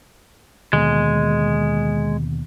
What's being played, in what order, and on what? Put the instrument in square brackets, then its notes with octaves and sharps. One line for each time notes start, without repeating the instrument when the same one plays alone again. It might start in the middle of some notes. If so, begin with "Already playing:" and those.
[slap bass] D#2 B2 D3 [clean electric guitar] G#3